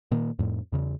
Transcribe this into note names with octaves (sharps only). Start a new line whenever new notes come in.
A#2 D#3 A#3
F2 A2
E2 C#3